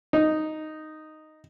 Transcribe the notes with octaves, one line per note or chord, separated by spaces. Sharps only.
D#4